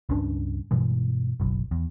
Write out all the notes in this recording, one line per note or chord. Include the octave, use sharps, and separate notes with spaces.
C#2 G2 C#4 D4
G2 B2 E3 G#3
F#1 B1
E2